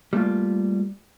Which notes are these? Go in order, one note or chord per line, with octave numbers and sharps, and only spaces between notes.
G3 A3 A#3 F4